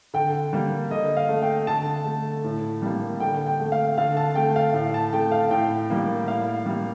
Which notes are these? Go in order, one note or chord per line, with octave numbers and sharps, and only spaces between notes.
D3 G5
G3 A#3
D3 D#5
F5
A3
G5
D3 A5
A3
A2
G3 A#3
D3 G5
G5
A3
F5
D3 F5
A5
A3 G5
F5
A2
A5
A3 G5
F5
A2 G5
G3 A#3
A2 F5
G3 A#3